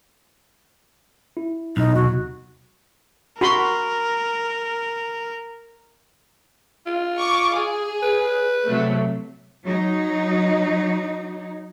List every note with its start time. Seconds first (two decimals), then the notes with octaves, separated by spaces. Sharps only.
1.37 E4
1.77 B1 D#4
1.95 D#2 C3 F#4
3.41 F#4 A#4 B5 C6
6.86 F4
7.18 C#6 D6
7.55 G#4
8.03 B4
8.67 C3 F#3 A3
9.63 F#3 D#4